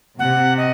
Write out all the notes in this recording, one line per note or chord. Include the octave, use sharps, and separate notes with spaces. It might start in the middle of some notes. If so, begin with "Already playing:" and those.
C3 F#5
D#5